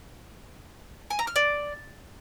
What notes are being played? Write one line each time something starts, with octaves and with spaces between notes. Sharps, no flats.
G#5
A#5
F6
D5